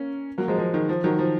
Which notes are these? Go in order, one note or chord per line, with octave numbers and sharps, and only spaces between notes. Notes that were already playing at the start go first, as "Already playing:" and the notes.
Already playing: A#3 C#4
F#3 A#3
F3 G#3
F3
D#3
F3
D#3 F#3
F3